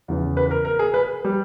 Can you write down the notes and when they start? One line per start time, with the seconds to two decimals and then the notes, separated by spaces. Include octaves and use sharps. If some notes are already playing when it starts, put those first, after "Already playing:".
0.08 E2 C#3 E3
0.37 B4
0.51 A#4
0.65 A#4
0.79 G#4
0.94 B4
1.25 G3